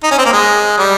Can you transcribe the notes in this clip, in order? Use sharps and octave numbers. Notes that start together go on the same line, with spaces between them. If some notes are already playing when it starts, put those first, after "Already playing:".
D#4
C#4
C4
A#3
G#3
G3